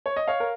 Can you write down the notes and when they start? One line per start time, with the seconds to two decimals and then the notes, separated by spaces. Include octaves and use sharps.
0.06 C#5
0.16 D#5
0.28 C#5 F5
0.40 A#4